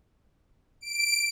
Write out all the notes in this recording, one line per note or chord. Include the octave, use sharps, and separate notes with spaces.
D7